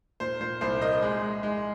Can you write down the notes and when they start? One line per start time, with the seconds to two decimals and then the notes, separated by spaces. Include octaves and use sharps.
0.20 A#2 C5
0.41 A#2 C5
0.61 C2 C5
0.81 A#3 D#5
1.02 G#3
1.22 G#3
1.43 G#3